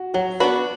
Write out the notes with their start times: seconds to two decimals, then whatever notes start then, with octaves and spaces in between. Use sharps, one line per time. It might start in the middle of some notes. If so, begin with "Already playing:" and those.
Already playing: F#4
0.14 F#3 F#4
0.40 B3 D4 F#4 B4